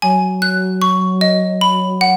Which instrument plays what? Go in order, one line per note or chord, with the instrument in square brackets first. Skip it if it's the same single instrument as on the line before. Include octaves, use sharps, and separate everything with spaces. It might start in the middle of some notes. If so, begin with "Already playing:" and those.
[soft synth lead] F#3 [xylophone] G#5
[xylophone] F#6
C#6
D#5
B5
F#5